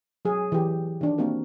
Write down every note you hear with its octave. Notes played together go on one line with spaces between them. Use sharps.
F#3 G#4
E3 G4
D#3 D4
A#3 C4 F#4 A#4